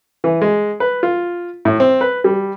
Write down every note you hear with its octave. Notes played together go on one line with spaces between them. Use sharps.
E3
G#3
B4
F4
A2
C4
B4
G3